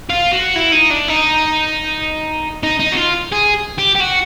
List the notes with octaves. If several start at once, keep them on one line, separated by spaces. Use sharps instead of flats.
F4
F#4
E4
D#4
D4
D#4
D#4
D#4
F#4
F4
G#4
G4
G4
F#4